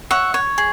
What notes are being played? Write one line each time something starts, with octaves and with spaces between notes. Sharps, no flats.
C#5 E5 F#5
C#5
G#4